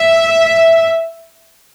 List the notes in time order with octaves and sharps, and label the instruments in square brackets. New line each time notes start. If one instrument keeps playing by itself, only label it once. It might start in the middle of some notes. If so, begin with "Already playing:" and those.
Already playing: [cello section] E5